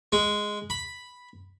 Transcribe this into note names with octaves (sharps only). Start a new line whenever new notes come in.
G#3
B5